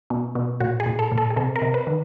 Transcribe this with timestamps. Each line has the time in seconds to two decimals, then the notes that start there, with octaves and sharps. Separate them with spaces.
0.10 B2
0.35 B2
0.60 A#2 F#4
0.80 G#4
0.86 A#2
0.99 A4
1.12 A#2
1.18 A4
1.30 G#4
1.36 C3 A4
1.56 A#4
1.62 C3
1.74 B4
1.87 D#3